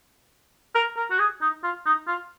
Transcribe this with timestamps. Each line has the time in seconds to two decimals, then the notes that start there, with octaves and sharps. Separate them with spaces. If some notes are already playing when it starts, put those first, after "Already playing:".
0.75 A#4
0.97 A#4
1.11 F#4
1.19 G#4
1.41 D#4
1.64 F4
1.86 D#4
2.08 F4